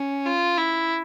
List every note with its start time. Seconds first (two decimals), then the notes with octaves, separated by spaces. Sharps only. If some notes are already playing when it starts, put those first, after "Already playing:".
Already playing: C#4
0.25 F4
0.57 E4